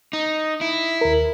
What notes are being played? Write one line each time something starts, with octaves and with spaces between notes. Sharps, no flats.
D#4
E4
D#2 A#4